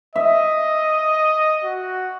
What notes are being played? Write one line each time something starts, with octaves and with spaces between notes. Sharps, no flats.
D#5 E5
F#4